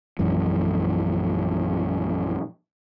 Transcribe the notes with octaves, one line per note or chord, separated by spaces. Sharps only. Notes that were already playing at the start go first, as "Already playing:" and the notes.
A#1 F#2 E3 G#3